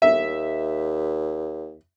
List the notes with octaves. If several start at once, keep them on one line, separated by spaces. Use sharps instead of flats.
D#2 E5